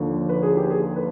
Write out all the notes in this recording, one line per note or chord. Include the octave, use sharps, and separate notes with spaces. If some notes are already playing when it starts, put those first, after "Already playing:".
Already playing: D#2 D3 F3
B4
G#4
G4
G#4
B4